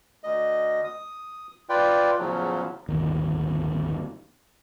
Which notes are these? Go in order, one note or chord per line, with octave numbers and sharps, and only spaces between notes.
D2 D#5
D#6
F4 B4 D5 G5
E2 A2 C#3 F3 F#3
D1 G1 D#2